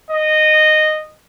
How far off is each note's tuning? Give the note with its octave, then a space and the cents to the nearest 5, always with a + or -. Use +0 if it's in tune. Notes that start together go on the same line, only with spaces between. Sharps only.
D#5 -15